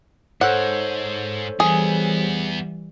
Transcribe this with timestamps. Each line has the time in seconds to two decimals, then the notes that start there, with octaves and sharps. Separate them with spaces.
0.41 G#2 A4 C5 C#5 F#5
1.60 E2 E3 G3 B3 G#4